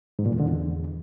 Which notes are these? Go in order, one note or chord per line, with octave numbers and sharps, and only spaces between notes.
G#2
A#2
E2
D3
E2